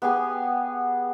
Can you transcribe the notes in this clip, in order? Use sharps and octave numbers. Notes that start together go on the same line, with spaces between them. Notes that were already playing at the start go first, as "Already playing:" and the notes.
B3 G4 G#4 G#5